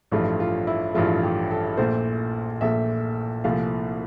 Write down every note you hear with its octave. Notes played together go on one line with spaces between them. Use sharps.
A1 G2 F3 A3 F4
F4
E4
A1 G2 F3 A3 F4
G4
A4
A#1 A#2 A3 C5
A#1 A#2 A3 E5
C2 A#2 F3 A3 F5